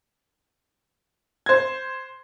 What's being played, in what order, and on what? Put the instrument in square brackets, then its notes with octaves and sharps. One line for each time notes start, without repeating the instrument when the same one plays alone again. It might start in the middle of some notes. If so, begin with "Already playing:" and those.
[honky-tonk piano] C5 G#6